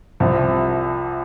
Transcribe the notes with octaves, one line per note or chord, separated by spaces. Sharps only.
C2 C3 F3